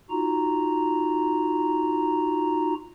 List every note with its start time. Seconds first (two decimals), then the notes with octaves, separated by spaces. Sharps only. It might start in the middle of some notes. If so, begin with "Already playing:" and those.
0.10 D#4 F4 F#4 A#5